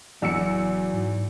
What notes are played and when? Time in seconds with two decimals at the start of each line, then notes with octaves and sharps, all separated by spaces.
0.22 D1 E2 F#3 E6 C#7
0.94 G#2